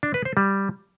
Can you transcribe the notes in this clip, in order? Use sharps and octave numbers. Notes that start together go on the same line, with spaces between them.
D4
B4
C5
G3